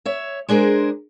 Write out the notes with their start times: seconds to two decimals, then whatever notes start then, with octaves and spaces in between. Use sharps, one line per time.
0.05 C#5 E5
0.48 G#3 D4 G#4 A#4 C5